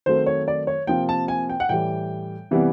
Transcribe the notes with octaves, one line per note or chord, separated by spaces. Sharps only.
D#3 F#3 A3 C4 C5
C#5
D5
C#5
C3 F3 A#3 G5
A5
G#5
G5
F#5
A2 E3 G3 G5
C3 E3 G3 B3